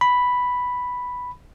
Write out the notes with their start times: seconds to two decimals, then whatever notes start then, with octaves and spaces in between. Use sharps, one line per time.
0.01 B5